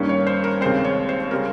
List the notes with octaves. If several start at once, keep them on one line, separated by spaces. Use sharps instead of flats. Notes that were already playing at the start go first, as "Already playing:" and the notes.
Already playing: G2 D#3 A#3 C#4
C#5
C5
A#4
D#2 C#3 G#3 C4 C5
C#5
C5
C#3 G3 C#4 A#4